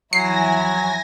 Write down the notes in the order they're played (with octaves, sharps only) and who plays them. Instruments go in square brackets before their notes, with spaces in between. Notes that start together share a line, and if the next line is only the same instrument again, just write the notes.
[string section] E2 F3 E4 [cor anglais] F#3 [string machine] G#5 A#6 [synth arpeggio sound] C7